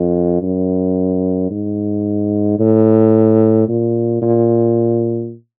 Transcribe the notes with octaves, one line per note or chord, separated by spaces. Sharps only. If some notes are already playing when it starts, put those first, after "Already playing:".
Already playing: F2
F#2
G#2
A2
A#2
A#2